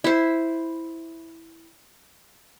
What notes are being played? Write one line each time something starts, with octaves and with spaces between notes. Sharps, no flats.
E4 C5